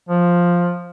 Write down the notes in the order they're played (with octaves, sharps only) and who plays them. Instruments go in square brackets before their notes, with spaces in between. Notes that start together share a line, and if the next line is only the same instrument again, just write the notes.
[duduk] F3